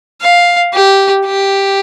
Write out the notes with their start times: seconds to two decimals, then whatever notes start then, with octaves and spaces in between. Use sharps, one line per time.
0.21 F5
0.74 G4
1.26 G4